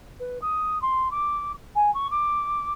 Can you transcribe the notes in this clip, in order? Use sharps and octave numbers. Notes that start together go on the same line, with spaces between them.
B4
D#6
C6
D6
G#5
C#6
D6